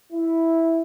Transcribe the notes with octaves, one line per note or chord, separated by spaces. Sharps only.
E4